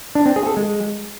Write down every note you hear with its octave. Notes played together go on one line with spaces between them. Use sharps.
D4
C4
G#4
A4
G#3